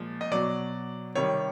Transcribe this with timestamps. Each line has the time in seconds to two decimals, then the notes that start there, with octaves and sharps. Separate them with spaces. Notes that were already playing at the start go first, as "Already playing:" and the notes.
Already playing: A#2 F3 G#3
0.21 D#5
0.32 B2 F#3 D5
1.15 C3 D#3 G3 C#5